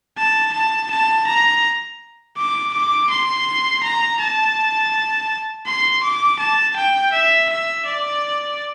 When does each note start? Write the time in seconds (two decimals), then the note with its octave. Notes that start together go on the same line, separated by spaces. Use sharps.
0.18 A5
0.54 A5
0.91 A5
1.28 A#5
2.38 D6
2.74 D6
3.11 C6
3.84 A#5
4.21 A5
5.67 C6
6.04 D6
6.40 A5
6.77 G5
7.13 E5
7.50 E5
7.86 D5